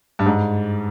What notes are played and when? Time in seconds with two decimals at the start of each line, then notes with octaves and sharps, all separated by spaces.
0.19 G2
0.26 G#2